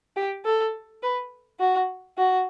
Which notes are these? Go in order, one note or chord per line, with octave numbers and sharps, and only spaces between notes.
G4
A4
B4
F#4
F#4